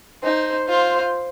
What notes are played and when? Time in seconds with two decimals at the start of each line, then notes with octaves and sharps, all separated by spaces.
0.23 D#4 C5
0.68 F4 C5